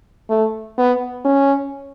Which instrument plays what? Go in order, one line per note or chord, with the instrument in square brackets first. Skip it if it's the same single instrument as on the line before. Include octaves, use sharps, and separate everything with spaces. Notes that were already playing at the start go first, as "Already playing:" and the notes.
[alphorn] A3
B3
C#4